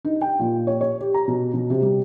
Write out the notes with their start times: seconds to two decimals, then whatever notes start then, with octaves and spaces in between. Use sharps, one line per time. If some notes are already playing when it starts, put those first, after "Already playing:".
0.05 D#4
0.21 G5
0.39 A#2
0.67 C#5
0.81 C#5
1.01 G4
1.14 A#5
1.28 B2
1.54 B2
1.70 C3
1.82 G3